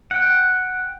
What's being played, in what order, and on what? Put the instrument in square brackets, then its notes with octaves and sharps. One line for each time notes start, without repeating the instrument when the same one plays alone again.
[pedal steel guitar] F#5 G5